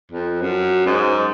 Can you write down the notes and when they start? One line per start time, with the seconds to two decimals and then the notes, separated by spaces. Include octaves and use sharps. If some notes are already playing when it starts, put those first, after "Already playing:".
0.12 F2
0.42 F#2
0.86 G#2